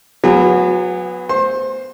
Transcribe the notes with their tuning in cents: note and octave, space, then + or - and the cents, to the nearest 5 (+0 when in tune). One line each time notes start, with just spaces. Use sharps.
F#3 -25 B3 +5 G#4 -35
C5 +0 C6 +35